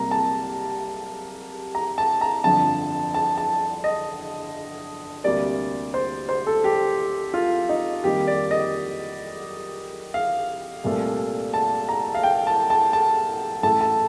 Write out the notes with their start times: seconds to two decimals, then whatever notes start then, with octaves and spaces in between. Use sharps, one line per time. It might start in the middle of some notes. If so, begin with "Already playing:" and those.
Already playing: C2 C3 G3 A#3 A#5
0.11 A5
1.75 A#5
1.98 A5
2.21 A#5
2.44 G1 F2 D3 F3 A5
3.14 A5
3.38 A5
3.84 D#5
5.24 D2 C3 G3 A#3 D5
5.94 C5
6.29 C5
6.47 A4
6.64 G4
7.34 F4
7.69 D#4
8.03 F2 D#3 G3 A#3 G4
8.27 D5
8.51 D#5
10.14 F5
10.84 C2 A#2 A3
11.54 A5
11.89 A#5
12.15 F5
12.23 G5
12.47 A5
12.70 A5
12.93 A5
13.63 A1 A2 A3 A5
13.81 A5